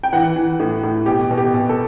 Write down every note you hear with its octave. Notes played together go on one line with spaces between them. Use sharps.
G5
E3 F#5
E3
A2
A2
B2 G4
B2
G4
B2
A4